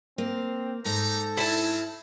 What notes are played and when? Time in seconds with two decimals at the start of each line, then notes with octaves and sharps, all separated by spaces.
0.18 A#3 C4
0.85 G#2 D#4 G4 A4 A#5
1.37 C4 C#4 E4 A5